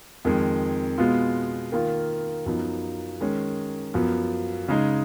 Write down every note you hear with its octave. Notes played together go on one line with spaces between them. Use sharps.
F2 D#3 G#3
B2 G#3 B3 F4
D#3 A#3 F4
F#2 F3 B3 D#4
D#3 G#3 C#4
F#2 F3 B3
C#3 G#3 D#4